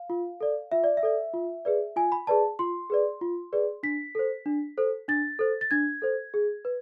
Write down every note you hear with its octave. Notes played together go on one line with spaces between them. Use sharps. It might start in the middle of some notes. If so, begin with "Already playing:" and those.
Already playing: F5
F4
A4 D5
F4 E5
D5
E5
A4 D5
F4
G#4 B4 D5
F4 G#5
B5
G#4 B4 D5 A5
F4 C6
G#4 B4 D5
F4
G#4 B4 D5
D4 B6
A4 C5
D4
A4 C5
D4 A6
A4 C5
A6
D4 G#6
A4 C5
G#4
B4